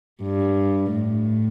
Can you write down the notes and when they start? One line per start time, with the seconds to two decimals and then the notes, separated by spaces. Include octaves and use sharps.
0.22 G2
0.93 A2